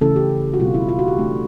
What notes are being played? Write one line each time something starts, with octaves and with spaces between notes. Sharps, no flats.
C#3 E3 A3 C#4 E4 A4
G4
F#4
B2 G3 C4 F4
E4
F4
F#4
G4
E3 A3 D4